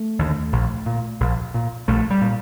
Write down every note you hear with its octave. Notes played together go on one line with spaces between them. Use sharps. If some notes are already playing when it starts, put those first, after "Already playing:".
Already playing: A3
D#2 D3
A#1
A#2
A#1
A#2
A#1 A3
G3
A#2